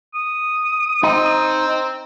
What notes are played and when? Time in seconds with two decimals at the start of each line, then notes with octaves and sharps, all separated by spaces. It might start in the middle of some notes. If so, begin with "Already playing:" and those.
0.14 D#6
1.03 C4 D#4